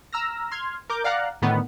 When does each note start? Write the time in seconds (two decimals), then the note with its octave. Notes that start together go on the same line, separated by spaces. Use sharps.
0.13 A#5 E6 F6 A#6
0.52 C6 F6 G#6
0.90 A#4 D6 G6
1.04 D5 F5 F#5 A#5 F#6
1.42 A2 D3 D#3 B3